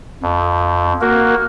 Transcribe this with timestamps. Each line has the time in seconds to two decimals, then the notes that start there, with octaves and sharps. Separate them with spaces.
0.22 F2
1.01 A#3 F#4 A#4